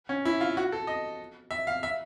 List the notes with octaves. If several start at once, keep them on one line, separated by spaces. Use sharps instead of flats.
C#4
E4
F4
F#4
A4
D#5
E5
F5
E5